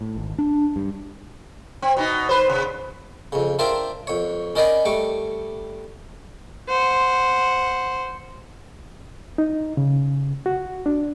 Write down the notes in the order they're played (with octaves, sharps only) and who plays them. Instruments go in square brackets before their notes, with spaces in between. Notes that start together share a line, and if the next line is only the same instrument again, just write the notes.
[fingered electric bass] A2
G#1
D4
G2
[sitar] C4
B2 D#4
B4 C5
C3
[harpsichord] F2 C#3
D4 F4 A#4 C5 E5 G5
F2 C#5
C#4 D#4 A#4 D5 D#5 B5
G3 A3 C#6 D6
[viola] C5 F#5
[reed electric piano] D#4
C#3
F#4
D4